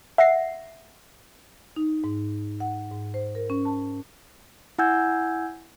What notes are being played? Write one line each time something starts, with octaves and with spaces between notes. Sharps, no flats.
E5 F#5 A#6 C7
D#4
G#2
F#5
G#2
C5
A#4
C#4
A5
E4 F#5 G#5 E6 G6 G#6